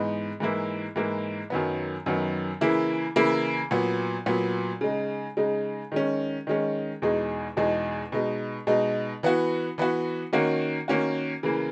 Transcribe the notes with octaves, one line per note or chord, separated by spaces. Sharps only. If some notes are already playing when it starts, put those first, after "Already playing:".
Already playing: G#2 E3 B3 D#4
G#2 E3 A#3 E4
G#2 E3 A#3 E4
F#2 D#3 F#3 B3
F#2 D#3 F#3 B3
C#3 E3 A#3 E4
C#3 E3 A#3 E4
A#2 F#3 B3
A#2 F#3 B3
C#3 G#3 D#4
C#3 G#3 D#4
D#3 G#3 C#4
D#3 G#3 C#4
E2 B2 G#3 D#4 G#4
E2 B2 G#3 D#4 G#4
B2 G#3 D#4
B2 G#3 D#4
E3 B3 F#4
E3 B3 F#4
D#3 A#3 C#4 F#4
D#3 A#3 C#4 F#4
C#3 E3 A#3